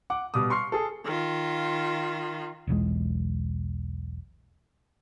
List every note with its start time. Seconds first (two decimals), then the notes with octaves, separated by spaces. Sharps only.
0.10 F#5 D6
0.34 B2 G3 D6 D#6
0.50 C6 C#6 F6 C7
0.72 G#4 A4
1.05 D#3 F4
2.67 E1 B1 E2 G#3